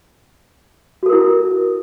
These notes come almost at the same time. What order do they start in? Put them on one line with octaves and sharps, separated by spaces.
F#4 A4 A#4 E4